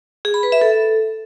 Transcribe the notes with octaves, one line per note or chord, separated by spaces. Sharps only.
G#4
B5
B4
E5
A4